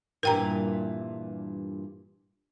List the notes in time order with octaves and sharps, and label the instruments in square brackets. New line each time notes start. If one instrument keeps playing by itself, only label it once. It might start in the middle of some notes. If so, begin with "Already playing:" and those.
[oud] G2 A#2 E3 [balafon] A#4 G5 A#5